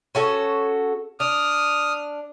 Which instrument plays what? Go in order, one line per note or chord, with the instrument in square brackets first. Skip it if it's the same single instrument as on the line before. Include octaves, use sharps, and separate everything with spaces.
[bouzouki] C#4 F#4 A4
[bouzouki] D4 [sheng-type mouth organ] D#6 F6